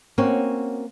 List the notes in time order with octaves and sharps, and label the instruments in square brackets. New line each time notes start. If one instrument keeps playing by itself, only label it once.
[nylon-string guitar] A#3 C4 C#4 F#4